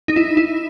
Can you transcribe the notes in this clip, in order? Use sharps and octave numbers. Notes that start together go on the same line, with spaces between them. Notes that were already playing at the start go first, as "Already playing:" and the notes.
D#4
E4
E4